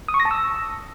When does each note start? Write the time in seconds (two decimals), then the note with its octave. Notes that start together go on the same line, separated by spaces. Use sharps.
0.08 D#6
0.14 C#6
0.20 A#6
0.25 A5
0.31 E6